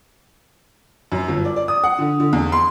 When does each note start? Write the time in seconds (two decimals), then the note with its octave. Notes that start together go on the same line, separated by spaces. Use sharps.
1.12 F#2
1.28 G1
1.45 D5
1.56 D5
1.68 D#6
1.84 F#5
1.99 D3
2.20 D3
2.33 E2
2.52 C6